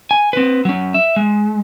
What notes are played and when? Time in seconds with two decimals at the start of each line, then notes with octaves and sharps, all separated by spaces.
0.11 G#5
0.33 C4 B4
0.65 F#3 C#4
0.94 E5
1.16 G#3